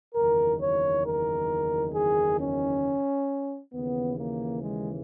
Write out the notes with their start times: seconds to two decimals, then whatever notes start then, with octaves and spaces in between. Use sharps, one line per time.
0.14 F#1 E2 D#3 A#4
0.60 C#5
1.04 A#4
1.93 G#4
2.38 C#4
3.73 D#2 C#3 E3 B3
4.18 A#3
4.62 G#3